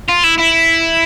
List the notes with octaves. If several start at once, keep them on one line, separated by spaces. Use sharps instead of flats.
F4
E4
E4